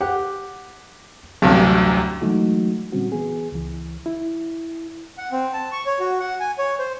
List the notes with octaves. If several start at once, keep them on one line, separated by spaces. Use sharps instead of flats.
G4 F#5
A1 D2 G2 C3 F#3
E3 F#3 G#3 A3 D#4 F#4
A#2 D3 G3 C4 C#4 F#4
E3 B3 G#4
C#2 E3
E4
F#5
C4
A5
C#6
C#5
F#4
F#5
G#5
C#5
C5